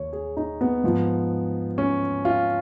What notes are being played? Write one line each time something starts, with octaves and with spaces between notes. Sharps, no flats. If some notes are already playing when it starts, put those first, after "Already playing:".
Already playing: D#2 C#5
G#4
D#4
B3
G#2 F3
C#4
F4